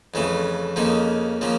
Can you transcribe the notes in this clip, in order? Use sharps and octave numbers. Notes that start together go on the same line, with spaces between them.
F2 C#3 E3 A3
F2 C#3 F3 A#3 D#4
C#3 F3 A#3